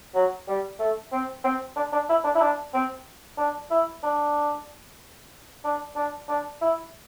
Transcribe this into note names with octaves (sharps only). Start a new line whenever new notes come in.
F#3
G3
A3
C4
C4
D4
D4
E4
D4
E4
D4
C4
D4
E4
D4
D4
D4
D4
E4